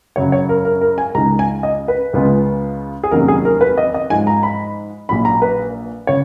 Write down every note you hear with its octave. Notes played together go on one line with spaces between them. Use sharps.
F#2 C#3 F#3 C#5
C#5
A#4
A#4
A#4
G#5
C#2 C#3 G#3 D#4 A#5
G#5
D#5
B4
C#2 C#3 G#3 B3 F4
G#4
F1 D#2 D#3 F#3 C#4 A#4
G#4
A#4
B4
D#5
D#5
G#2 F3 G#3 G#5
A#5
B5
A#1 A#2 F#3 B5
A#5
B4
C#3 C#5